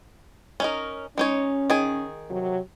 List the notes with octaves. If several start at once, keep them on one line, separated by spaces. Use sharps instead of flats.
C#4 D#4 A#4
G#3 C#4 D#4 C#5
D#3 G#4
C3 F#3